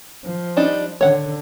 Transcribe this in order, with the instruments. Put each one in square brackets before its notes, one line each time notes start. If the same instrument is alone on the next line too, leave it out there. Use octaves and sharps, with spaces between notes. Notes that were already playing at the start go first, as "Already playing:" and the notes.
[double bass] F3
[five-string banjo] G3 D4 D#4
[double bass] D3 [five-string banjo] C#5 F#5